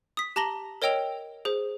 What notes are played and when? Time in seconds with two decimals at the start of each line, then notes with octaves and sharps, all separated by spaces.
0.17 D#6 B6
0.36 G4 A5 A#5 A#6 F#7 G7
0.82 A#4 C#5 D#5 G5 E6 F7
1.45 G#4 C5